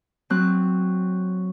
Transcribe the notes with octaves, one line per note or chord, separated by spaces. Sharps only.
F#3 C4 F#6